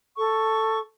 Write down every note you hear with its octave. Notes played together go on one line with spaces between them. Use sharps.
A4 C#6